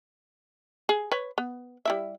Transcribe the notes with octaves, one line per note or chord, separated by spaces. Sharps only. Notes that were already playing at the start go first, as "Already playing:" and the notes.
G#4
B4 C#5
B3
G3 E4 E5